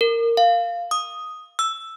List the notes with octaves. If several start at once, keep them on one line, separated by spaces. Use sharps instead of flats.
A#4
F5
D#6
E6